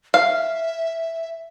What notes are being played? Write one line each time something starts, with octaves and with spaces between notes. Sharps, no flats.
E5 F5